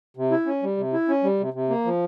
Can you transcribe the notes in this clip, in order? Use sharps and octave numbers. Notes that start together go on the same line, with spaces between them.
C3
E4
C#4
G3
C3
E4
C#4
G3
C3
C3
A#3
F3